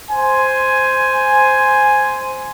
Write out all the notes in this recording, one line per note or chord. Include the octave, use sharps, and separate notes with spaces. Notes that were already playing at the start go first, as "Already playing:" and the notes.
C5 G#5